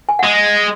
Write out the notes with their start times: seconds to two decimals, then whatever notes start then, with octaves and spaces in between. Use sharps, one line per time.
0.09 G#5
0.19 G#3 F#5